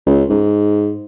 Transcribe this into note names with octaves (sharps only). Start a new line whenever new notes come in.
C#2
G#2